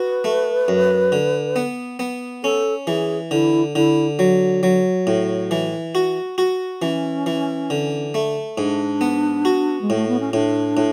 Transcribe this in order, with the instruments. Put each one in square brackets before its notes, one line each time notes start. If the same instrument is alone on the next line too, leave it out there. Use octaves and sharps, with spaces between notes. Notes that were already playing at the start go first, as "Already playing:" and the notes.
Already playing: [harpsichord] F#4 [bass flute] B4
[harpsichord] A3
F#2
D3
B3
B3
[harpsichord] C#4 [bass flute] A4
[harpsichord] E3 [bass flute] G#4
[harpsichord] D3 [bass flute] E4
[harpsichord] D3 [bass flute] E4
[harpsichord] F#3
F#3
A2
E3
F#4
F#4
[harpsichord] E3 [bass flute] C#4
[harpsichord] E3
D3
A3
[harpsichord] G#2 [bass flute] D4
[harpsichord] B3
F#4
[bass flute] G#3
[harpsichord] A2
[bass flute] A3
B3
C#4
[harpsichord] A2 [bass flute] D4
[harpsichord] A2